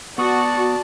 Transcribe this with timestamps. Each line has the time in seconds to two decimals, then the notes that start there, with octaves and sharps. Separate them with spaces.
0.18 B3 F#4 D5 A5 C#6 D#6